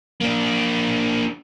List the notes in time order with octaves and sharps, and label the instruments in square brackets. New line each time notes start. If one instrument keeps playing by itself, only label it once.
[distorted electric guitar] A#3 D4